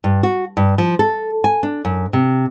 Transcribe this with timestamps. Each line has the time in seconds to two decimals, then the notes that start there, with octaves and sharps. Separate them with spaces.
0.04 G2
0.23 F#4
0.57 G2
0.78 F3
0.99 A4
1.44 G#5
1.63 D4
1.85 F#2
2.13 C3